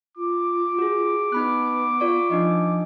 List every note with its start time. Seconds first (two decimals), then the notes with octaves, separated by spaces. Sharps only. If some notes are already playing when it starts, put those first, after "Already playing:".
0.17 F4 D6
0.78 F#4 G#4
1.32 B3 D#4 B5 F#6
2.00 F4 D5 C#6
2.30 F3 D4 D#4 D#5